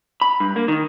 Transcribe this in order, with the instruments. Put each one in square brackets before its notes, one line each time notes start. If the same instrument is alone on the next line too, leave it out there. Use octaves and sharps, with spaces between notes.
[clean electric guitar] B5
G2
A#3
D#3